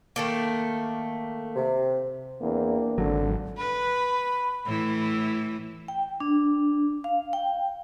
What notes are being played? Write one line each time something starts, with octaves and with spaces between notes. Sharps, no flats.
D#3 A3 A#3
C3
E2 A#3 C4 D4
G#1 D3 F#3
B4 B5
A2 E3 E4
G5
D4
F5
G5